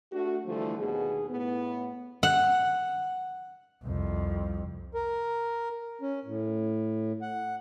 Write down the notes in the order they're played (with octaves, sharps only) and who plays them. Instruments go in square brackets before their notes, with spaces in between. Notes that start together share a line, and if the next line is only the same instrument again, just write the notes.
[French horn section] A3 D4 F#4
D3 E3 F3 G3 A3
D#2 B2 G#4
A2 B3
[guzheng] F#5
[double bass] C2 F2
[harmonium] A#4
C#4
A2
F#5